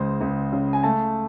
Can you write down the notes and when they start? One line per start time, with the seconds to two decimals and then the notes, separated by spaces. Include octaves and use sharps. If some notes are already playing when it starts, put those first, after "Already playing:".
Already playing: C#2 G#3 C5
0.21 C#2
0.53 C#3
0.73 G#5
0.83 A3 A5